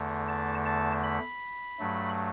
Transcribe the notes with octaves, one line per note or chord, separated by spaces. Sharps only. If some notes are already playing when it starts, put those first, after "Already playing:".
Already playing: E2 D3 A3
A5
A5
B5
G2 F#3 A3